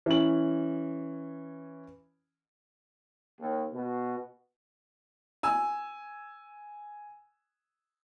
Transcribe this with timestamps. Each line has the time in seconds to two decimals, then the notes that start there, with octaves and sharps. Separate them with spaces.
0.06 E3 C#4 F#7
3.40 D#2
3.73 B2
5.43 G#5 E6